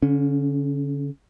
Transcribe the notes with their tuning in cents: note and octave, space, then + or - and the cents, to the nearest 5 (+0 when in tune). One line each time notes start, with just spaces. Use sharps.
D3 -45 C#4 +0